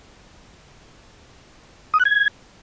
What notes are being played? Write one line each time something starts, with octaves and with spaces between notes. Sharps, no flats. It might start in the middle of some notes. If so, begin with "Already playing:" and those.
D#6
F#6
G#6